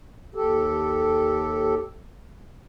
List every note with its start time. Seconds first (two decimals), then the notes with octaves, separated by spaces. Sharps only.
0.35 D#2 G4 A4